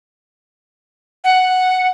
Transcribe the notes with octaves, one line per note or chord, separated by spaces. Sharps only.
F#5